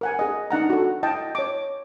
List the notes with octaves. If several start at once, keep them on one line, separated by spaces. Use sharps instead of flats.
A#4 F#5 G#5
G#4 D#5
D4 D#4 F#5 A#5
F#4 A4
E4 D#5 G5 A5
C#5 D6